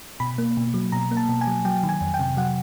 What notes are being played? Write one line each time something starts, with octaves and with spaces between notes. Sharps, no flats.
B2 B5
A#3
B2
F#3
B2 A#5
A#3
A5
B2
G#5
F#3
F#3 G5
D#3
G#5
F2
G5
C3
F#3 F#5